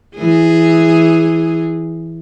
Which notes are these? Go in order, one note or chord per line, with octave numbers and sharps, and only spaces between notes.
E3 G#4